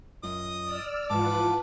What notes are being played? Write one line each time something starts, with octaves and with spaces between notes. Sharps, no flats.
F#2 F4 D#5 D#6
D5 E6 F6
G#2 E3 F3 F4 B4 F#5 A5 D6